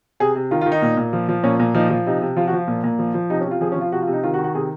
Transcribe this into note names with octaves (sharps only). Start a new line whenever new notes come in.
C3 G#4
C3
D#3 F4
F4
D#3
D#4
A#2
A#2
F3
F3
A#2 C#4
A#2
F3 D#4
F3
C3 D#4
C3
F3 F4
F#4
F3 F4
A#2
A#2
F3
F3
C3 D#4
C#4
C3
F4
F3 G#4
C#4
F3
F4
C3 F#4
F4
C3
D#4
D#3 F4
F#4
D#3
F#4
C3 G#4